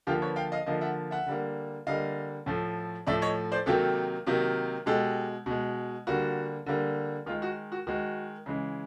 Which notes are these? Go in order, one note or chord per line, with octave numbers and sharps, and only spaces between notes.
D3 F3 A#3 F4 G4
B4 C#5
F5 G5
D#5 F5
D3 F3 A#3 D#5 F5
E5 F#5
E5 F#5
D3 G3 A#3
D3 G3 A#3 D#5 F5
A2 F3 A3
A2 F3 A3 D5 E5
C#5 D#5
C5 D5
C3 D#3 F#3 A#3 G4 A4
C3 D#3 F#3 A#3
B2 G#3 G4 A4
B2 G#3
D3 G3 A#3 F#4
D3 G3 A#3
D#3 G#3 F4
F#4
F#4
D#3 G#3 F#4
C#3 E3 G#3